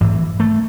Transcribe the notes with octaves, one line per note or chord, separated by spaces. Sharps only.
G#2 E3
A3